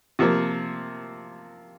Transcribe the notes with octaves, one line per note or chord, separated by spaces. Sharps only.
C3 F3 A#3